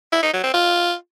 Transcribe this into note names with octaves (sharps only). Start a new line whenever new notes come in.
E4
D#4
F#3
C4
F4